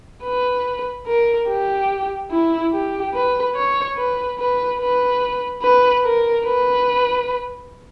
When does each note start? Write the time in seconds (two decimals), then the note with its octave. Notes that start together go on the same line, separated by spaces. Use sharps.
0.23 B4
1.07 A#4
1.48 G4
2.31 E4
2.73 G4
3.14 B4
3.55 C#5
3.97 B4
4.39 B4
4.80 B4
5.62 B4
6.04 A#4
6.46 B4